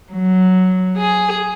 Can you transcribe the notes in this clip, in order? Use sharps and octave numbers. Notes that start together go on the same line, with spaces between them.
F#3
G#4